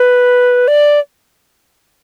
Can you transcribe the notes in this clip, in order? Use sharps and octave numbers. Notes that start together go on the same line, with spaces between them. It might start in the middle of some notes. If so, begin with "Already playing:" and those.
Already playing: B4
D5